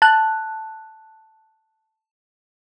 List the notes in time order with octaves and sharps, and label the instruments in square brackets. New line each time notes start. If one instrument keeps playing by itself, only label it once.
[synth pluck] A5 F#6